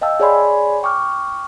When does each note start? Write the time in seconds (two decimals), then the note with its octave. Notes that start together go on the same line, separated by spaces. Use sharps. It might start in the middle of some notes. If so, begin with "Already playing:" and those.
0.01 D#5 F5 G5 A5 E6
0.20 G#4 C#5 D5 G#5 B5 C6
0.83 G5 C#6 D6 F6